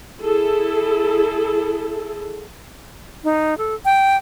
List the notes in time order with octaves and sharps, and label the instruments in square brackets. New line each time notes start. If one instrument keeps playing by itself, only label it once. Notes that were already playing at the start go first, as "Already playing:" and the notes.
[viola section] E4 G#4 A4
[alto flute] D#4
A4
G5